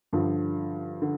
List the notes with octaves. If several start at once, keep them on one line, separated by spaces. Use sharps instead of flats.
G2 D3 F3
D3